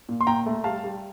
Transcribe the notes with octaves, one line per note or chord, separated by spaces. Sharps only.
A#2
C6
A#2 G5 A#5
A3
G3 F5 A5
G3